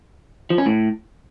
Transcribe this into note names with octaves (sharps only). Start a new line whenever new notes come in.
F3
C#4
A2